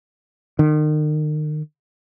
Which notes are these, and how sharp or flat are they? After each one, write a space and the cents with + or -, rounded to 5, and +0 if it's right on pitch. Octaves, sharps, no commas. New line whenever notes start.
D#3 -35